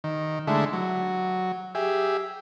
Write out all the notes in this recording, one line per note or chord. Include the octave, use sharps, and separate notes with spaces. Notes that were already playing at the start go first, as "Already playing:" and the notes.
D#3
D3 G#3 A3 E4
F#3
G4 G#4 E5